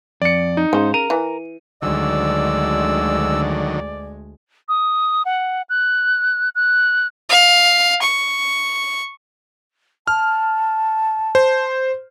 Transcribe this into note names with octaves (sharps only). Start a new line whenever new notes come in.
F2 D5 C#7
D#4
G#2 C#3 C5
A#4 A#5 D#7
E3
D2 D3 D#3 F#3 G#3 D5 E6
D#6
F#5
F#6
F#6
F5
C#6
A5 F6
C5